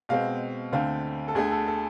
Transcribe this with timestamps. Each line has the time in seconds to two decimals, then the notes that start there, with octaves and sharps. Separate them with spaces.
0.09 B2 G#3 C4 F5
0.72 D2 D3 A3 C4 F5
1.28 A4
1.35 D2 D3 A3 G#4
1.52 A4
1.67 A4